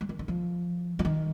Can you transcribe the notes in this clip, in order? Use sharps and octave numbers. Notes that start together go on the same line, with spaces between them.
G3
D#3
D#3
F3
F3
D#3